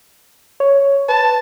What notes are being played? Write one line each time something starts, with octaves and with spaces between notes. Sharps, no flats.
C#5
B4 A5